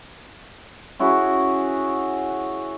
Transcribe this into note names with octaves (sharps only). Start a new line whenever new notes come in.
C#4 E4 F#4 G#4